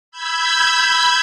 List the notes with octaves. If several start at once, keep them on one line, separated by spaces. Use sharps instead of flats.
B5 E6 G6 G#6